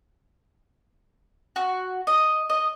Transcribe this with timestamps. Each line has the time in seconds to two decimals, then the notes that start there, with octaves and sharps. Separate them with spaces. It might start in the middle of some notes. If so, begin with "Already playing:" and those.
1.56 F#4
2.07 D#5
2.50 D#5